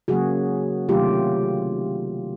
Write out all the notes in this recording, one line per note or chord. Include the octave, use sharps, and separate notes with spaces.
C#3 F#3 A#3 F#4 G#4
C3 D#3 F#3 A3 F4 G4